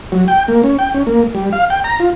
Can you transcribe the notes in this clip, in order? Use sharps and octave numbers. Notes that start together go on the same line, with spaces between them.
F#3
G5
A#3
C#4
G5
C#4
A#3
G3
F5
G5
A#5
F4